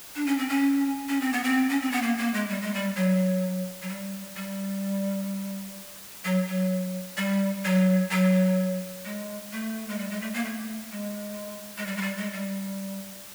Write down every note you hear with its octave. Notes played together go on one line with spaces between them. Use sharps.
D4
C#4
C4
C#4
C#4
C4
B3
C4
C#4
C4
B3
A#3
A#3
G#3
G3
G#3
G3
F#3
F#3
G3
G3
F#3
F#3
G3
F#3
F#3
G#3
A3
G#3
G3
G#3
A3
A#3
A3
G#3
G#3
G3
G#3
G3
G#3
G3